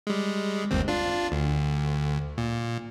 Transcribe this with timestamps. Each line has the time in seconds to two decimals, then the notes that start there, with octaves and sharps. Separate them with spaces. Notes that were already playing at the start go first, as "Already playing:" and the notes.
0.07 G3 G#3
0.71 G1 D#2 C4
0.88 D4 F4
1.32 D2
2.38 A#2